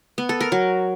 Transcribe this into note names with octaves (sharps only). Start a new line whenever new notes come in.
B3
A4
A#4
F#3